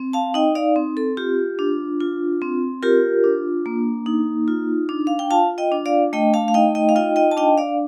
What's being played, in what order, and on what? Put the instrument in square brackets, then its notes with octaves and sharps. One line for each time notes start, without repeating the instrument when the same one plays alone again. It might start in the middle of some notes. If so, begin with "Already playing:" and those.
Already playing: [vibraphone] C4
F5 A5
D#4 D#5 G5
D5 F5
C4
A4
F4 G4
D4
F4
C4
F4 G4 A#4
D4
A#3
D#4
F4
D4
F5
G5
F4 F5 A5
D#5 G5
D4
D5 F5
A3 D#5 G5
F5 A5
F5
D#4 D#5 G5
D#5 G5
F5
F4 D#5 G5
D#5 G5
A5
D4 D#5 G5
D5 F5